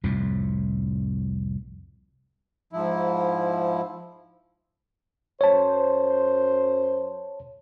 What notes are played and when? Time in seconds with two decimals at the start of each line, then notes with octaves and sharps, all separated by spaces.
0.04 C2 F2 A2
2.73 G#2 F3 E4
5.41 F#2 C5 C#5 A5